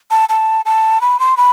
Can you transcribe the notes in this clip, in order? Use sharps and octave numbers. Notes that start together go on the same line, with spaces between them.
A5
A5
A5
B5
C6
B5